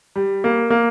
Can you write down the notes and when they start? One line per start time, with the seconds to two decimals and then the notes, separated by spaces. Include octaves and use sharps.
0.16 G3
0.44 A#3
0.70 A#3